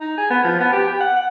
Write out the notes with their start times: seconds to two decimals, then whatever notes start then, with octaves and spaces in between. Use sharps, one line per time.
0.01 D#4
0.18 G#4
0.30 B3
0.44 F3
0.60 B3
0.72 G4
0.88 G5
1.00 F#5
1.16 F#5